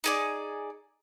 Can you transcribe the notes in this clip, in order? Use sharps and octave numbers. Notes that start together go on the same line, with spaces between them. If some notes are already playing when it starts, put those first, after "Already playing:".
D#4 G#4 D5